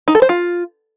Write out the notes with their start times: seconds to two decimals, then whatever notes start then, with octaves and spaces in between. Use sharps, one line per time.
0.08 D#4
0.15 A4
0.22 C5
0.29 F4